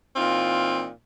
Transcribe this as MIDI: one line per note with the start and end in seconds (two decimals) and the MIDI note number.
0.16 0.87 46
0.16 0.87 52
0.16 0.87 60
0.16 0.87 63
0.16 0.87 65